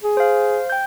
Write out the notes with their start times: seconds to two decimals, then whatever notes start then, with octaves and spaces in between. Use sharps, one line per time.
0.03 G#4
0.17 C5 F5
0.70 G5 G6